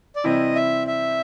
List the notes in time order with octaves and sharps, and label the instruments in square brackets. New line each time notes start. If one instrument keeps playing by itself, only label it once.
[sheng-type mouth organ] D5
[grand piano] C3 E3 G3 C4 E4 [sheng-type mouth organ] D#5
[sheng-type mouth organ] E5
E5